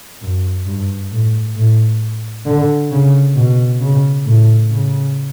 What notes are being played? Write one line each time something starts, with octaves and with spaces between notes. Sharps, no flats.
F#2
G2
A2
A2
D3
C#3
B2
C#3
A2
C#3